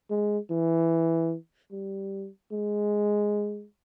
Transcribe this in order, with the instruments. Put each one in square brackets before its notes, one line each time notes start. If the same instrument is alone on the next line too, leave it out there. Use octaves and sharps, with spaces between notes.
[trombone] G#3
E3
G3
G#3